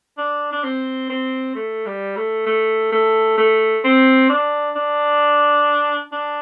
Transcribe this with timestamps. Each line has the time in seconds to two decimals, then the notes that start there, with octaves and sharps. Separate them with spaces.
0.18 D4
0.52 D4
0.64 C4
1.10 C4
1.55 A3
1.86 G3
2.17 A3
2.46 A3
2.93 A3
3.38 A3
3.84 C4
4.30 D4
4.76 D4
6.12 D4